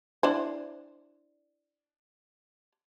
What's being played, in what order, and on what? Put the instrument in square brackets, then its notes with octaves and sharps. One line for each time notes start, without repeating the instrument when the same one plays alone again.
[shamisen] D4 E4 C5